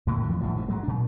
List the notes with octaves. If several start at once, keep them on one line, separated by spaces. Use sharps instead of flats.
C#2 A2 C3 A#3
F2 D3 E3 F3
G1 D2 A2 F3
G2 C3
G#2 F#3 G#3
A#2 D4